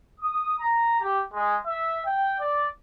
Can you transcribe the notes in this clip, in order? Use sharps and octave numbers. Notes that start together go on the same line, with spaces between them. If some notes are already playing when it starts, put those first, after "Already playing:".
D#6
A#5
G4
G#3
E5
G5
D5